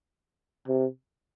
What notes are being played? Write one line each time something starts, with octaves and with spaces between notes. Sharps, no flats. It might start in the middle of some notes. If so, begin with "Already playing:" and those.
C3